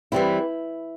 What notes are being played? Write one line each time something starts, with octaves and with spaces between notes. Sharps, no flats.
E3 G3 C4 E4